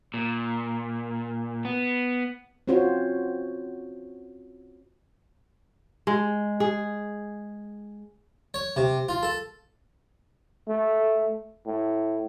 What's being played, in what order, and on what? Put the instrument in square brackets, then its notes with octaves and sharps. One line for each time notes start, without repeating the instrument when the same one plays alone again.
[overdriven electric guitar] A#2
B3
[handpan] C4 C#4 F4 F#4 C5 C#5
[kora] G#3
G#4
[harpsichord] C#5
C3
F4
A4
[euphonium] A3
A2